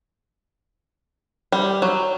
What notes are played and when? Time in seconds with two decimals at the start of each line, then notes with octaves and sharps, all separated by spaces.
1.52 G3
1.82 F#3